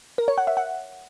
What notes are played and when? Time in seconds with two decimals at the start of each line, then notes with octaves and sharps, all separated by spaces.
0.18 A#4
0.28 C#5
0.38 F#5
0.47 E5
0.57 F#5